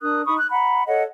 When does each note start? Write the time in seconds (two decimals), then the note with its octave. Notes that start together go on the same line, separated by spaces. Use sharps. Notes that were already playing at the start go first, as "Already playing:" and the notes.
0.01 D4 A#4 D#6 F#6
0.26 D#4 B5 C#6 D#6
0.38 F#6
0.51 F#5 A#5 B5
0.87 A4 C#5 D#5 F#5